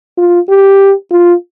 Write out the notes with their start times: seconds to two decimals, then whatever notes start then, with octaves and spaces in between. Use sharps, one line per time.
0.18 F4
0.49 G4
1.11 F4